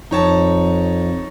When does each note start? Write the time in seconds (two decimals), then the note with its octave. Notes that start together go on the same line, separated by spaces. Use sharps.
0.11 F2 D#4 C#5 A5